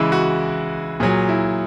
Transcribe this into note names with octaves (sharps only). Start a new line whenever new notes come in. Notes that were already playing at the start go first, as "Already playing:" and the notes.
Already playing: C#3 E3 G#3 E4
F#4
A#2 F#3 G#4
E4